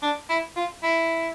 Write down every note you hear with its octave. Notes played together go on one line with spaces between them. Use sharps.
D4
E4
F4
E4